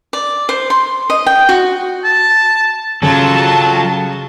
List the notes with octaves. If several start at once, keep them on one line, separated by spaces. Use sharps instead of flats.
D5
C5
C6
D#5
G5
F#4
A5
C#3 F#3 F4 A4 A5